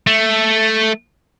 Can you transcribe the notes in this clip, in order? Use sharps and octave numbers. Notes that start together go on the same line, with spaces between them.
A3